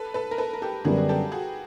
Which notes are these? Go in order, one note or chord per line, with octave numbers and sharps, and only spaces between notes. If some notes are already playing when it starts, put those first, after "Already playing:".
Already playing: A4 B4
A4 B4
A#4
A4 B4
A#4
G4 A4
F#2 D3 G3 B3 D4 F#4 G#4
G#4
G4 A4
F#4 G#4